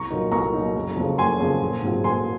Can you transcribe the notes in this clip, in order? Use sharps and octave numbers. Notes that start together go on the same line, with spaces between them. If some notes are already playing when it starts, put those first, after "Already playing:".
Already playing: C2 A#5 C#6
A#2 F#3 A#3 D#4
C2 A#5 C#6
A#2 F#3 A#3 D#4
F#1
F2 C#3
F#1 G#5 C6
F2 C#3
A#1
G#2 F#3 C4 F4
A#1 G#5 C6